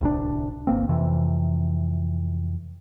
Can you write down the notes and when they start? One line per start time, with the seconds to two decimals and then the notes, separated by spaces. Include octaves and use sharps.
0.01 D1 C2 A#2 D4
0.67 G1 C2 A#3 C4
0.89 F2 C3 E3